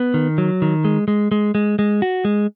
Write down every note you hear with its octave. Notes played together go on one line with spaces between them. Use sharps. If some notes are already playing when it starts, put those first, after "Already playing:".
Already playing: B3
D#3
F#3
D#3
G#3
G#3
G#3
G#3
G#3
F#4
G#3